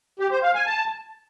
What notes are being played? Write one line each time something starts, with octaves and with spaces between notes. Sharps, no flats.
G4
C5
F5
G#5
A5